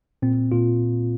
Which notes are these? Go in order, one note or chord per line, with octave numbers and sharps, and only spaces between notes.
A#2 C4
A#2 F4